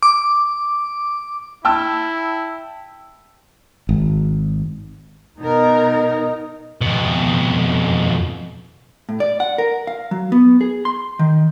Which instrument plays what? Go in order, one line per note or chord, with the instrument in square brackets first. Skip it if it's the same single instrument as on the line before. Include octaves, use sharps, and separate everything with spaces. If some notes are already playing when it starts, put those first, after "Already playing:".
[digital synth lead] D6
[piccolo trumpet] E4 [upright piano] G5 A5 E6
[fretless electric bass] G#1
[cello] B2 A#4 [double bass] D#4
[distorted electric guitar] F2 B2
[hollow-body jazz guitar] A2
D5
F#5
A#4
F5
F#3
B3
G#4
C6
D#3